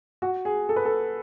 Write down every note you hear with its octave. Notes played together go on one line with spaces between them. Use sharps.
F#4
G#4
A4
B4
A4